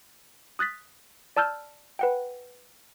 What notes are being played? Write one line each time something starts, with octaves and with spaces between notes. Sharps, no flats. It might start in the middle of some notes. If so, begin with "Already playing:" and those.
D#6 F#6 A6 B6
D5 A5 E6 F6 G6
B4 F#5 G5